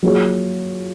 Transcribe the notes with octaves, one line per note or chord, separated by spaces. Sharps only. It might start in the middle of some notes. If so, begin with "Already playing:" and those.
F#3 A#3 F4 G#4 C#5